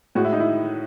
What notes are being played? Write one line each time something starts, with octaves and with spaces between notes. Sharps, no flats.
A2 G#3 F#4
E4
D#4
E4